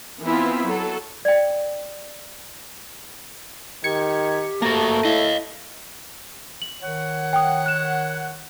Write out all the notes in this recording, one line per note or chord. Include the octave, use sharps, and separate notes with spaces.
E3 B3 C4 E4 F4
F#3 A4
D5 G5
D#3 G4 G#6 C#7
A3 A#3 F#4 A5 A#5 A#6
E4 D#5 F5
F#7
D#3 C#5 F#5
G5 D#6
F#6 E7